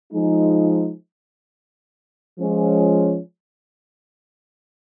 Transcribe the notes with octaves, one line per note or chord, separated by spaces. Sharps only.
F3 G#3 D#4
F3 G#3 C#4